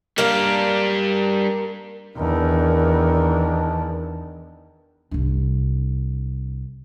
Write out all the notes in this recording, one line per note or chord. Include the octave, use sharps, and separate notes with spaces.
G3 A#3 D4 A#4 F5
E2 D#3 D4 A#4
C2 D4